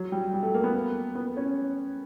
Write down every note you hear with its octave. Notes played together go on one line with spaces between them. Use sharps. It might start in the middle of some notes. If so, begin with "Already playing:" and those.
Already playing: F#3
G3
G3
A3
A#3
B3
B3
C#4